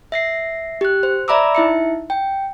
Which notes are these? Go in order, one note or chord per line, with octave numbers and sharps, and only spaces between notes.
E5 A#6 C7
G4 F#6
C5
D5 E5 A#5 B5 D6 E6
D#4 E4 E5 C#7
G5